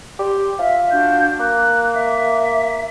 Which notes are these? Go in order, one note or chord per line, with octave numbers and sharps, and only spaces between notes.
G4 C6
F4 E5
D4 F#4 G6
A#3 F#6
E5